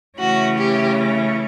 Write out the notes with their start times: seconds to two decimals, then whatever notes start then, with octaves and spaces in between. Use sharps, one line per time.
0.19 C#3 E3 A3 C#4 F#4
0.59 G4